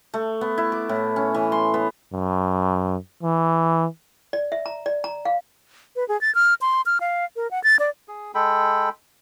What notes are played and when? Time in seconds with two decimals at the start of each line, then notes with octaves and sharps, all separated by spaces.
0.14 A3
0.41 B3
0.58 E4
0.72 D6
0.89 A2
1.16 C#4
1.34 E3
1.52 C6
1.74 B3
2.13 F#2
3.23 E3
4.33 D5
4.52 E5
4.66 A#5
4.86 D5
5.04 A#5
5.25 F5
5.96 B4
6.09 G#4
6.21 A6
6.35 F6
6.61 C6
6.86 F6
7.01 F5
7.36 A#4
7.51 F#5
7.64 A6
7.79 D5
8.08 G#4
8.35 G#3 A4 G5 B5